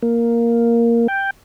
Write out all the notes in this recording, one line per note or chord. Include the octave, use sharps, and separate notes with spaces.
A#3
G5